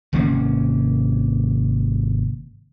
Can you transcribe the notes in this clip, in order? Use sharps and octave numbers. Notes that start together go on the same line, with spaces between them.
G#1 C3 A#3 C#4